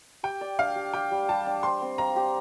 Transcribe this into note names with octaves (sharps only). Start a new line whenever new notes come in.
G4 G5
D5
D4 F5
G4
G4 G5
G3
G3 A5
D4
C5 C6
C4
F5 A#5
G4